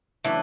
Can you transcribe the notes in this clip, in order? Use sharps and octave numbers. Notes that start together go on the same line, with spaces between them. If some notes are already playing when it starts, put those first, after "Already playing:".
C#3 E3 F#3 A3 D4